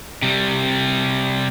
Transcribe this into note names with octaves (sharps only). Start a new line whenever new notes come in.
C3 G3